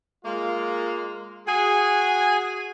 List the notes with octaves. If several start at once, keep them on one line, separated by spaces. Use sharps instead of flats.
G#3 A#3 F4
F#4 G#4 G#5